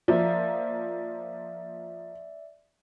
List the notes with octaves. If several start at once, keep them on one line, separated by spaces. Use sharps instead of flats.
F3 A#3 D5 E5